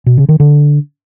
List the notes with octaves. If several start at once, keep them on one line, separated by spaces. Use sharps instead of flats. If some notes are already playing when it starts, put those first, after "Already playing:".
B2
C#3
D#3
D3